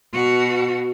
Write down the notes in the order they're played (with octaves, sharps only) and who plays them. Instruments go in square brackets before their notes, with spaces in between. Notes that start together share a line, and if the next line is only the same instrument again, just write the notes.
[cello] B2 F#4